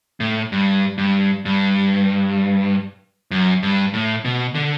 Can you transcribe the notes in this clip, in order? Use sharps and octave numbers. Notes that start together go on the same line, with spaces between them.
A2
G2
G2
G2
F#2
G2
A2
B2
D3